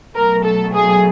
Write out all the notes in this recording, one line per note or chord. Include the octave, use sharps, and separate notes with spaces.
B2 F#3 A3 A#4
A4
G#4